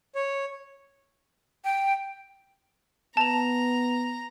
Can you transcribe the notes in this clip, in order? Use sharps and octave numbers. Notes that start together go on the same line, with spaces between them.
C#5
G5
B3 A5 A#5 F7